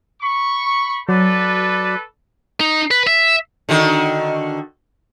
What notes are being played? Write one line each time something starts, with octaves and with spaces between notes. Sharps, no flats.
B5 C#6
F#3 A4 B4 D5
D#4
B4
E5
D3 D#3 F#4